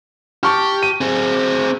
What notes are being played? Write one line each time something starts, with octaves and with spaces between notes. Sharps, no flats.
G4 A5 C#6 F6
D#7
C4 G#4